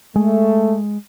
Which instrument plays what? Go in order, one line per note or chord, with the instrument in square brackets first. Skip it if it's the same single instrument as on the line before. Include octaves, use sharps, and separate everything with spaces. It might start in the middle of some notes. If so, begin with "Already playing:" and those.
[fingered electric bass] G#3 [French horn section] A3